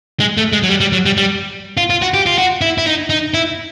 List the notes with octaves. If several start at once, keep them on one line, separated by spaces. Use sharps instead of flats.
G#3
A3
G#3
F#3
G3
G3
F#3
G3
G3
F4
F4
F#4
G4
F4
F#4
E4
E4
D#4
D#4
E4